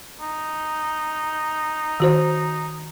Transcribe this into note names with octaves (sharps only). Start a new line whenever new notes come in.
D#4
D#3 F#4 C5